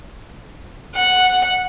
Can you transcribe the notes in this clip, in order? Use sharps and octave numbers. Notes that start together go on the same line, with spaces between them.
F#5